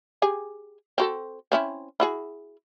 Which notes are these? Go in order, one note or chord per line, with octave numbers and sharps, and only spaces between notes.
G4 G#4 G#5
C4 F#4 A4
C4 C#4 E4
E4 F#4 G#4